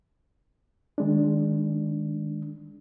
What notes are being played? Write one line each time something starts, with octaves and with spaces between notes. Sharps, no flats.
D#3 G#3 D4